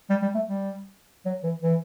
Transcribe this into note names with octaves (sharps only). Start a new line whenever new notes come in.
G3
G3
A3
G3
F#3
E3
E3